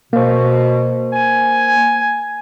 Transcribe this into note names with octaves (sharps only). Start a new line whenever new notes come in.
B2 A#3 C5
G#5